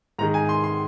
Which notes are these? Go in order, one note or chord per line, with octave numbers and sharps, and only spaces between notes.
G#2 D#3 G#3 A#5
G#5
C6
C6